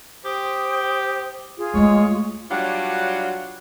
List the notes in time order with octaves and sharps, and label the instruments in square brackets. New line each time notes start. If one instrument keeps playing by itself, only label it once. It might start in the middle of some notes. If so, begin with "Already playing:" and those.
[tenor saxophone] G4 [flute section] C5 G5 D#6
[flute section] F4 G#4
[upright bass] D#2 A3 [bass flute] G#3 [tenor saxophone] C#5
[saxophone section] F#3 G3 D4 F4 C#5 F#5